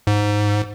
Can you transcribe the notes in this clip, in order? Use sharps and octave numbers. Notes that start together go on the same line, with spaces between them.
G#2